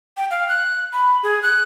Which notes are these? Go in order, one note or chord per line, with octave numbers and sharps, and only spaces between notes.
G5
F5
F#6
B5
G#4
F#6